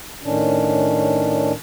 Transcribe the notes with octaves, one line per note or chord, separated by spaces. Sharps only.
A2 D#3 C#4 D4